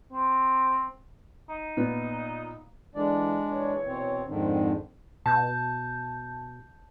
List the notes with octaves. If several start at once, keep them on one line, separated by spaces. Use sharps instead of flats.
C4
D#4
A#2 B3
D3 E3 G#3 D4 D5
A#2 E3 C#5
B2 C4
F2 G#2 D3 D#3 C4
B2 A5 G6